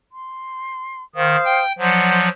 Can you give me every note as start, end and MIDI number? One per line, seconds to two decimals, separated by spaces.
0.13 1.03 84
1.15 1.36 51
1.15 1.63 72
1.15 1.63 77
1.15 1.63 87
1.45 1.72 79
1.78 2.29 53
1.78 2.29 54
1.78 2.26 72
1.78 2.26 74
1.78 2.26 78